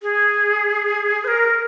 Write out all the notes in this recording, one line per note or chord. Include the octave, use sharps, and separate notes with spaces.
G#4
C5
A#4